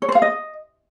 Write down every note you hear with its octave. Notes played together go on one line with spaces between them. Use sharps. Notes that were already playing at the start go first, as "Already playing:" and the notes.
C#5
C5
F5
D#5